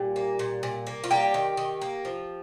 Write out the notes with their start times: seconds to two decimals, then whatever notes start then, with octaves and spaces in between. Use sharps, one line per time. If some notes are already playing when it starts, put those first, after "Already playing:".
Already playing: A#2 G3 G4
0.16 A#3
0.39 A#2
0.63 A#2
0.87 A#3
1.04 F4
1.11 G3 A#3 G4
1.34 D#3
1.57 D#3
1.81 A#3
2.05 F3